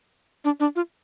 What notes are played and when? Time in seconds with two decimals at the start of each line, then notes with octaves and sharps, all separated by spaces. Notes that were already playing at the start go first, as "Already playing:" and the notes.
0.45 D4
0.60 D4
0.76 F4